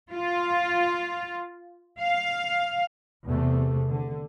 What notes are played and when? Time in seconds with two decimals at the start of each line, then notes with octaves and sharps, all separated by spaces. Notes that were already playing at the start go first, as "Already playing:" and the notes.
0.12 F4
2.01 F5
3.26 E2 C3 A3
3.91 D3